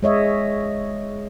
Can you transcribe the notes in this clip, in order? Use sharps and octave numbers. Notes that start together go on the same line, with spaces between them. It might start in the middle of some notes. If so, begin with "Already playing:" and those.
G#3 C#5 D#5 E5